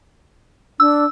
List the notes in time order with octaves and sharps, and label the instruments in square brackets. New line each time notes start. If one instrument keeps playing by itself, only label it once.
[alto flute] D4 [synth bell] E6